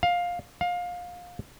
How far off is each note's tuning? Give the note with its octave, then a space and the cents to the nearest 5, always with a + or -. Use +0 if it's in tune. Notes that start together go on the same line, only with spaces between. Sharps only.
F5 +15
F5 +25